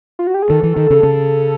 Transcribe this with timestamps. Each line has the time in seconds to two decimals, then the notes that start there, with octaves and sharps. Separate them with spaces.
0.19 F4
0.27 F#4
0.34 G4
0.42 G#4
0.50 D#3 A4
0.63 E3
0.77 D#3
0.90 C#3
1.03 C#3